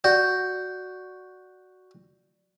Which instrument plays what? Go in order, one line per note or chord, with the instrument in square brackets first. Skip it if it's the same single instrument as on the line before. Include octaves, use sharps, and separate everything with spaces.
[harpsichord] F#4 [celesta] D5 G6